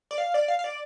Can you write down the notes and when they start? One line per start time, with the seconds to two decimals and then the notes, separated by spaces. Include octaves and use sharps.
0.11 D5
0.18 F5
0.34 D5
0.48 F5
0.59 F5
0.64 D5